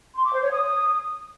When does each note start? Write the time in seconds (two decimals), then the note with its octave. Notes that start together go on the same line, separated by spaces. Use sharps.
0.15 C6
0.24 D6
0.33 C5
0.42 C#5
0.51 D#6